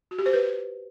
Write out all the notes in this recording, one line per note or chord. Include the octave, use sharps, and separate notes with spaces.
F#4
G4
C5
B4